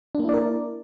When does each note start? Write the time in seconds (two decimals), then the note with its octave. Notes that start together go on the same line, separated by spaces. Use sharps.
0.15 D4
0.19 A#3
0.24 E4
0.29 D5
0.34 A#4